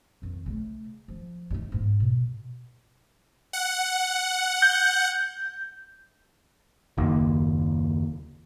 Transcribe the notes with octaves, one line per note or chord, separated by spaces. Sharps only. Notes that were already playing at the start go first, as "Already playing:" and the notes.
F2 D#3
C#3 A3
F3
G2 D#4
G#2 B3
B2
F#5
G6
F#1 D#2